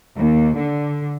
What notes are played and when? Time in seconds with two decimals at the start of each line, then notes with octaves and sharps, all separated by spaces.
0.16 D#2
0.57 D3